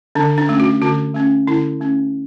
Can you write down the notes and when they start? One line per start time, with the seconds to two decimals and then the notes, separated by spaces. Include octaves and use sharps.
0.15 D3 D4
0.38 D4
0.49 A3 C#4
0.60 F#4
0.82 D3 F#4
1.14 A3 C#4
1.47 D3 E4
1.80 A3 C#4